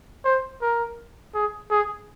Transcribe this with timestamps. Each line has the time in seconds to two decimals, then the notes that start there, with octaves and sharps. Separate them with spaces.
0.25 C5
0.62 A#4
1.35 G#4
1.71 G#4